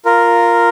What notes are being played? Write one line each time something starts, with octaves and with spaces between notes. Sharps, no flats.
F4 A#4